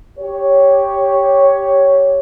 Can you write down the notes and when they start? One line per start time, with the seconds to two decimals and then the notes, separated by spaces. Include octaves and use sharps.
0.19 G4 C#5